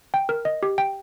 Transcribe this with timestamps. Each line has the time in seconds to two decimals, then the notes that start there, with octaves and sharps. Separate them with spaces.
0.14 G5
0.29 A#4
0.45 D#5
0.63 G4
0.78 G5